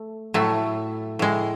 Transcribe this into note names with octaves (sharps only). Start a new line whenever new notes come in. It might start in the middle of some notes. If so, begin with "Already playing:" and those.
Already playing: A3
A2 F#3 A3
A2 G#3